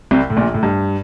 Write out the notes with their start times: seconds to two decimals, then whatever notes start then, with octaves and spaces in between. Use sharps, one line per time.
0.11 C2 C3
0.30 A2
0.37 A#1 A#2
0.54 A2
0.63 G2